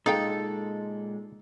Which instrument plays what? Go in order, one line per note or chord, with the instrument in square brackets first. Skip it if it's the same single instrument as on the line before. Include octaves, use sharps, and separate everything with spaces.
[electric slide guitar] A#2 G#3 [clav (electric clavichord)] D#4 [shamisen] G#4 F5 G5 [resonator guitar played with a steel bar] A4